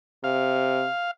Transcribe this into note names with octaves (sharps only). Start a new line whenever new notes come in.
C3 F5